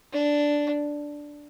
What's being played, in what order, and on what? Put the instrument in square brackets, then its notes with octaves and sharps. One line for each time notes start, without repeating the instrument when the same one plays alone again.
[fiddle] D4